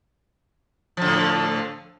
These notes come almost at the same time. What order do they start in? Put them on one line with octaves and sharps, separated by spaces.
F3 D3 A2